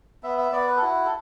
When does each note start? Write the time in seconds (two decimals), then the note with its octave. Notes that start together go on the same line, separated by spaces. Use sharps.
0.23 B3 E5
0.38 E5
0.52 B3 D5
0.67 B4
0.77 A4
0.82 E4 F#4
1.06 A4